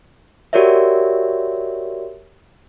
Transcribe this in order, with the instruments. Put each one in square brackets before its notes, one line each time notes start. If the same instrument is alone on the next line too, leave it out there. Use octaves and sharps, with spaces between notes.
[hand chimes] F#4 G4 A#4 C#5 D5 E5